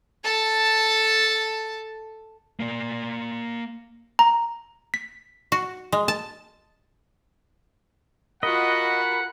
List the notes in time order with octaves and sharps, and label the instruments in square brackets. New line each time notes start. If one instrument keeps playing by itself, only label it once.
[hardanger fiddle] A4 A5
[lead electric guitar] A#3 D5
[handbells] A#5
B6
[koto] F#4
G#3
A5
[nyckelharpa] F4 F#4 [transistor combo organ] A#4 B5 [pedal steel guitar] D#5 [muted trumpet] F#5